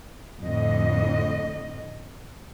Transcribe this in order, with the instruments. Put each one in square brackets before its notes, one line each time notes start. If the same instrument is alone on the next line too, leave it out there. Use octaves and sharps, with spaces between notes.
[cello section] F2 A2 D3 D#5